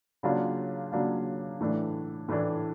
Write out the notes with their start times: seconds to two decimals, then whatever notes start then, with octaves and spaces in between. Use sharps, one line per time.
0.23 C#3 F#3 A#3 D4 F4
0.92 C#3 F#3 A#3 D4 F4
1.61 A2 E3 A3 D4
2.28 A2 E3 A3 D4